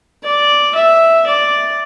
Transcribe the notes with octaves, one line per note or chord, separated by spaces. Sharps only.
D5
E5
D5